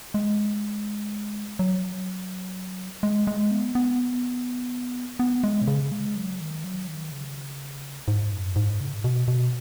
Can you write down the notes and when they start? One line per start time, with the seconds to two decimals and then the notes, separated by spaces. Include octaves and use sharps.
0.14 G#3
1.59 F#3
3.03 G#3
3.27 G#3
3.51 B3
3.75 B3
5.20 B3
5.44 G#3
5.62 B2
5.67 C#3
5.92 G#3
6.16 F#3
6.40 D#3
6.64 F#3
6.87 D#3
7.12 C#3
8.08 G#2
8.32 F#2
8.56 G#2
8.80 C#3
8.94 G#2
9.04 B2
9.28 B2